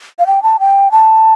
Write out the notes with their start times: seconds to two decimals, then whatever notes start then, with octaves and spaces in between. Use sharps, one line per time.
0.19 F5
0.27 G5
0.43 A5
0.60 G5
0.92 A5